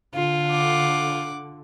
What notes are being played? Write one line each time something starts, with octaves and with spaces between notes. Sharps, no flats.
D3 F4
F#5 D6